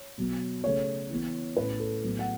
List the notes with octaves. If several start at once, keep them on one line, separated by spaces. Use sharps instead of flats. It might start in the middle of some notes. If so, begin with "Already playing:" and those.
Already playing: C#5
B2 F#3 B3
C#3 A3 C#4 C#5
E3 B3
A2 A3 C#4 B4
A4
A2 F#3 B3
F#5